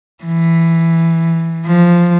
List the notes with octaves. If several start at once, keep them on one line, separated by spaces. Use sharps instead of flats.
E3
F3